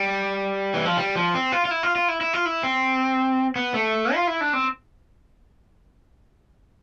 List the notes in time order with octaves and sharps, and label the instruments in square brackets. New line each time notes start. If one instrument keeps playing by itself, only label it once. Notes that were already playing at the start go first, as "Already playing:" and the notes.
Already playing: [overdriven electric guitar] G3
E3
F3
G3
F3
C4
F4
F4
E4
F4
F4
E4
E4
F4
E4
C4
B3
A3
F4
E4
D4
C4